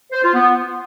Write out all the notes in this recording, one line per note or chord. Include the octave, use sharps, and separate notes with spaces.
C5
F4
B3